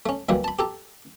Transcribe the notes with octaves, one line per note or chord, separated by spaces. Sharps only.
A3 C#4
D2 E3 F#3 G3 A#3
A5 B5
G4 A4 A#5